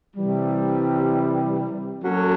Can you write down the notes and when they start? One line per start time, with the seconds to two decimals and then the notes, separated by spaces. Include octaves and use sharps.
0.16 C3 E3 G3
2.04 F#3 A#3 C#4 F#4 A4